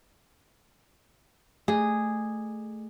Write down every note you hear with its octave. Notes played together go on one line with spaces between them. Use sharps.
A3 G#4